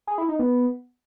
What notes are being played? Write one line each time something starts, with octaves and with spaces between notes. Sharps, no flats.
G#4
E4
D#4
B3